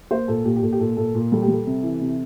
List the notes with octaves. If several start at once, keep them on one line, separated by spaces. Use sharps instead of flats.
A#3 C5
A#2 A4
A#2 G4
G4
A#2 A4
G4
A#2 A4
A#2 A4
A#2
G3 A4
G4
G3 A4
C3
E3
C3